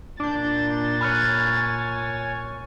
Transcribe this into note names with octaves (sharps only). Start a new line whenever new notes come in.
A#2 D4 G6 A6
C#5 G#5 B5 F6 F#6